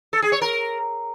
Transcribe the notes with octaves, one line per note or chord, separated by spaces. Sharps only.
A4
G#4
C#5
A#4